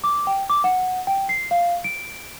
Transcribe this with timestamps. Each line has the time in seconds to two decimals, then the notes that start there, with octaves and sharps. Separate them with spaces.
0.04 D6
0.27 G5
0.50 D6
0.64 F#5
1.07 G5
1.29 C7
1.51 F5
1.84 D7